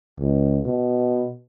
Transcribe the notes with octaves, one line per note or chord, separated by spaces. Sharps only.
C#2
B2